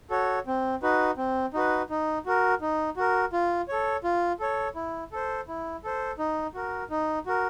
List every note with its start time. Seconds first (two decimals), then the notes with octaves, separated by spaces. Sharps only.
0.10 F#4 A4 C#5
0.47 C4
0.83 D#4 F#4 B4
1.17 C4
1.54 D#4 F#4 B4
1.90 D#4
2.26 F#4 A#4
2.61 D#4
2.97 F#4 A#4
3.33 F4
3.68 A4 C#5
4.04 F4
4.40 A4 C#5
4.75 E4
5.12 A4 C5
5.48 E4
5.84 A4 C5
6.19 D#4
6.55 F#4 A#4
6.90 D#4
7.26 F#4 A#4